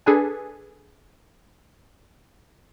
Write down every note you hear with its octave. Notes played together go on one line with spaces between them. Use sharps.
D4 G#4 A4 B4 G#5